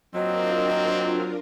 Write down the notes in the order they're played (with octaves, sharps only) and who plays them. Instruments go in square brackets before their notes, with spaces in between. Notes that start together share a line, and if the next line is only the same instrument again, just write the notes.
[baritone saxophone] F#3 [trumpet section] A#3 C4 [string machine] D4 F4 A#4 [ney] D#5